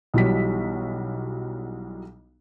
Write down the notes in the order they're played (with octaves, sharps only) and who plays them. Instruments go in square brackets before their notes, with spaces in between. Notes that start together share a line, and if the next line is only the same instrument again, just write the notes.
[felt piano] B1 E3 F#3 G3 B6